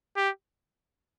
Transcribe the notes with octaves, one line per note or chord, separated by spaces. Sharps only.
G4